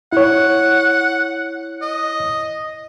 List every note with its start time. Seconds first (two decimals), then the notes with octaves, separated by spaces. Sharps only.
0.13 E4 C#5 F#5
1.82 D#5